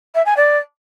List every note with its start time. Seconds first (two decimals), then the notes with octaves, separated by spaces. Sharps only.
0.15 E5
0.26 G#5
0.37 D5